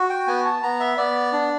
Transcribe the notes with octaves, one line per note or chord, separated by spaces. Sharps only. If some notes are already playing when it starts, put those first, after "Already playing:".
Already playing: F#4
G5
B3 G#5
A5
B3 A#5
E5
B3 D5
D4